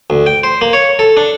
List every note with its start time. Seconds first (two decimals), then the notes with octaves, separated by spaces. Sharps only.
0.10 D2
0.26 G5
0.43 C5
0.61 A#3
0.73 C#5
0.99 A4
1.17 D4